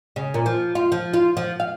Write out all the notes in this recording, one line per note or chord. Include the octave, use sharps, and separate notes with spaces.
C#3
A#2
F3
F4
F3
F4
F3
F5